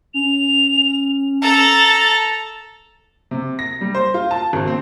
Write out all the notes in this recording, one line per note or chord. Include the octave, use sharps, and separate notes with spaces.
C#4 F7
A4 A5 A#5
C3
A#6
G3
C5
F4
A5
G#1
C4